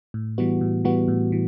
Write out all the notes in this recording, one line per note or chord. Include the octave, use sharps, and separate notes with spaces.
A2
E3 G3 B3 F#4
A2
E3 G3 B3 F#4
A2
E3